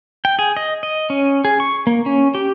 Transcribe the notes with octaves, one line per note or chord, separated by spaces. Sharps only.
G5
G#4
D#5
D#5
C#4
G#4
C#6
A#3
C#4
G4